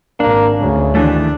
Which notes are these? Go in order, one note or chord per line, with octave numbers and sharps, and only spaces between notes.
G#1 A#3 D4
D2 C#3
D#3 E3 A3 D4